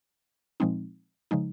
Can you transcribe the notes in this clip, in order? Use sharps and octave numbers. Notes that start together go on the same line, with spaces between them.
A#2 F3 G#3 C4 D#4
C#3 F3 G#3 D#4